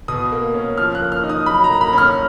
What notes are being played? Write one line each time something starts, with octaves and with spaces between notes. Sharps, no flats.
B2 D#6
A#3
C#4
F3 F6
F#6
A#3
F6
D#4
D#6
F#3 B5
A#5
A#3
B5
C#4 F6